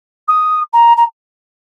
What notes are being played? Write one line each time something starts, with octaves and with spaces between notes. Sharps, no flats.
D#6
A#5
A#5